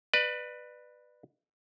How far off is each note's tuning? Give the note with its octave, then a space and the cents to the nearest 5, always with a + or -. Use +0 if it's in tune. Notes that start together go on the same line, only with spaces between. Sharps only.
B4 +0 D5 +30